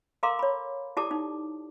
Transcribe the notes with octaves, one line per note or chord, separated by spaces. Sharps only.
A4 A#4 F5 A#5 C6 D6
C#5 B5
E4 G4 A4 D5 A5 D6
D#4